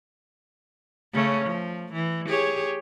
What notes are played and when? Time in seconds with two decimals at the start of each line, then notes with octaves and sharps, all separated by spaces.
1.13 C#3 A3 C#4
1.45 F3
1.93 E3
2.28 G4 G#4 C#5